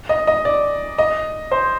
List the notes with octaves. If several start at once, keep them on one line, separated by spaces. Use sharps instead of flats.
D#5
D#5
D5
D#5
C5